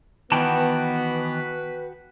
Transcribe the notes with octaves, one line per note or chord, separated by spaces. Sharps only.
D#3 E3 B3 F#4 B4 G5 A5